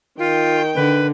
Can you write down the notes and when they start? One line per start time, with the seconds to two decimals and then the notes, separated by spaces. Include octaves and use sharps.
0.19 D#3 F4 G5
0.76 D3 B4